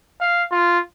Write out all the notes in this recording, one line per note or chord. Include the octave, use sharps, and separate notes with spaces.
F5
F4